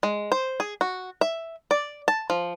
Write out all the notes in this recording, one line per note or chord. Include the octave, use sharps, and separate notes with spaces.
G#3
C5
G#4
F#4
E5
D5
A5
F3